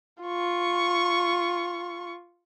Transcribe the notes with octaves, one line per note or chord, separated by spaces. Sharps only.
F4 C#6